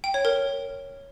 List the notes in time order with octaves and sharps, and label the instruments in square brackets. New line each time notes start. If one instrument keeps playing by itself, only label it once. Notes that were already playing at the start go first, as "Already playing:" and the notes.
[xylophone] G5
C#5
A#4